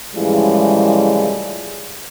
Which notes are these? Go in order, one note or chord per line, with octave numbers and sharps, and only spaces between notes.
A2 C#3 E3 F3 G3 G#3